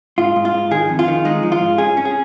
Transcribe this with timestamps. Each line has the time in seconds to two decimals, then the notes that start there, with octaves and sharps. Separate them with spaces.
0.18 G#2 F4
0.36 G#2
0.45 F4
0.54 G#2
0.71 D#3 G#4
0.89 F2
0.99 F4
1.08 D#3
1.25 G#3 D#4
1.43 F3
1.52 F4
1.61 G#2
1.78 C#4 G#4
1.97 C#4
2.05 G#4